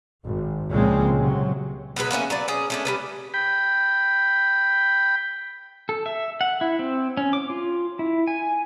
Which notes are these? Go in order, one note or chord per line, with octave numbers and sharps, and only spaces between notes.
G#1
C#2 A#2 C#3 F3 G#3 C4
C3 F#3
B2 F#3 G#3 B4
A#3 B3 C#4 E5
F#3 B4 D5
C#4 G#4
A3 C#4 D4
G3 C#4 B4
G5 B5
A4
E5
F#5
E4
C4
C#4
D6
F4
E4
G#5